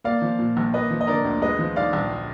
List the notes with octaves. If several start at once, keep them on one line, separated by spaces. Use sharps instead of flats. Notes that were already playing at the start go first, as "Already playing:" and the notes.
A#3 D5 F5
F3
A#2
A#1
A#3 B4 D#5
F3
D#5
D3 A#4 D5
D2
G#3 B4 D#5
F3
G#2 D5 F5
A#1